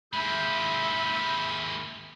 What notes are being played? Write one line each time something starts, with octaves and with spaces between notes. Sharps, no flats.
G#3 A#3 E5 B5 G6